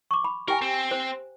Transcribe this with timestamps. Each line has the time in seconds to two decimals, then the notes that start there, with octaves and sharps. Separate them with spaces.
0.11 C#6 D6
0.24 B5
0.48 G4 A#4 G5 G#5
0.62 C4
0.91 C5